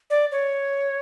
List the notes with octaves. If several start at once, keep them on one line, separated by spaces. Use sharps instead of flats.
D5
C#5